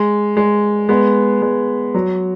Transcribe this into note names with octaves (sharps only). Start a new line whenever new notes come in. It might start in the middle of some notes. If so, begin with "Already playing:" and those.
Already playing: G#3
G#3
G#3 B3
G#3
F#3